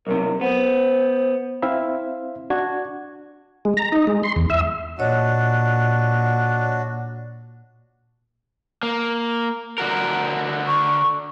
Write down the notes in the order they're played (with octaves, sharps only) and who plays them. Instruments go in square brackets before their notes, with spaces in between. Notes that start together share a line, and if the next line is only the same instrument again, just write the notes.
[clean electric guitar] B1 F#2 C3 [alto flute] A#4
[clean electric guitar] B3 [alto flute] C5
[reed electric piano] C4 E4 C5 E5 F5
D4 F#4 G#6
[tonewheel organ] G#3
A#5
D#4
G#3
C6
E2
E5
[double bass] A#2 [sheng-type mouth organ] D4 F#4 [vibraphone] C#5 D#5
[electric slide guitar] A#3
D3 F#4 A#4
[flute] C#6